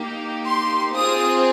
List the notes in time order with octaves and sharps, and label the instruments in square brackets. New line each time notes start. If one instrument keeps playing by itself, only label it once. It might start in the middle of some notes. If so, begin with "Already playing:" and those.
Already playing: [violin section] A#3 D#4 G4
C6
C4 F4 G#4 D#6